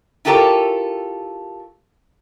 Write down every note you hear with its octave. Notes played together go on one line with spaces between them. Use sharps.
E4 F4 G4 A4 A#4 C#5